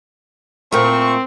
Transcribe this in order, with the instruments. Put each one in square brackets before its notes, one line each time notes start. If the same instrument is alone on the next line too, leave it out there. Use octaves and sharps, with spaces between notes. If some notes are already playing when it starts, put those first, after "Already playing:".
[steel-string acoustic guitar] A#2 A3 [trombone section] C4 [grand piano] A#4 [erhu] C#6